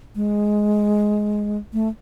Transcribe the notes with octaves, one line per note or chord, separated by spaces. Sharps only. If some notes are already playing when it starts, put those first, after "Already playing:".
G#3
A3